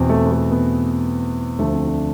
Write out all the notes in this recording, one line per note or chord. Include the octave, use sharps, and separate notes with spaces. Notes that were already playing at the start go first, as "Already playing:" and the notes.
Already playing: E2 B2 C4
A3
B3
A3
B3
D2 D3 F3 A3
C4
D4